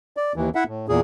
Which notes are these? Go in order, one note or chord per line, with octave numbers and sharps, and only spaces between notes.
D5
D#2 E3
E4 E5 F#5
A2
E2 A#2 G#4